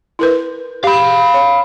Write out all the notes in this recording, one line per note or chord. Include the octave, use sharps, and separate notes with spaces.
E4 A#4 B4
G4 F5 B5
C#5